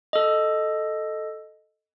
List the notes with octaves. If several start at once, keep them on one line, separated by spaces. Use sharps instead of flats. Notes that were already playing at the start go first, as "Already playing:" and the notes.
A4 D#5